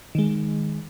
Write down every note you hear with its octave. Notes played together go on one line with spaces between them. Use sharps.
D#3 G#3